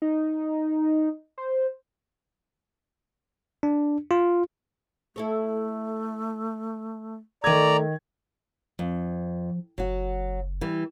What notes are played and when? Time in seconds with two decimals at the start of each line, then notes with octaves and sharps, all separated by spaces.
0.02 D#4
1.38 C5
3.63 D4
4.11 F4
5.16 A3 E4 A4 C#5
7.44 D#3 A3 D5 D#5 A#5 G#6
8.79 F2 F3
9.78 F#1 F#3 F#4
10.61 E3 G3